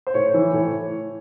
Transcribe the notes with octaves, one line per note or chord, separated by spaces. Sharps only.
C5
A2 C#5
E3
A2